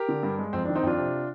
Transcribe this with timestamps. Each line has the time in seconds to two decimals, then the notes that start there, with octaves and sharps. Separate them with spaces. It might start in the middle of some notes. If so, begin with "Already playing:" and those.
Already playing: G4 A#4
0.08 D3
0.23 G2
0.39 G#3
0.53 F2 C4
0.65 D4
0.68 D#3
0.75 C4 D#4
0.83 F2 D4 F4
0.98 C3